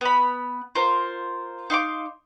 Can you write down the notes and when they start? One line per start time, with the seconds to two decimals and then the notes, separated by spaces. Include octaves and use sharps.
0.01 B3 B5
0.75 F4 A#4 C5
1.70 D#4 F5 C6 D6